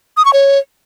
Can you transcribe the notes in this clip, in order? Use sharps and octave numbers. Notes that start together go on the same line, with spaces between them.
D#6
C#6
C#5